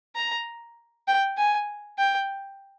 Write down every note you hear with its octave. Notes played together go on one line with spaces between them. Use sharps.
A#5
G5
G#5
G5